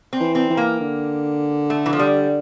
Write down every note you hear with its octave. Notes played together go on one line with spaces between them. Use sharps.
C4
E3
C4
E3
A#3
D3
A3
E3
F3
G3